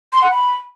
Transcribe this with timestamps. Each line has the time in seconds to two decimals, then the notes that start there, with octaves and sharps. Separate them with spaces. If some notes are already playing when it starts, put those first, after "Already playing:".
0.13 C6
0.22 F#5
0.31 B5